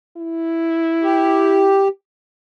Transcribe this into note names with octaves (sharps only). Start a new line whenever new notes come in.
E4
G4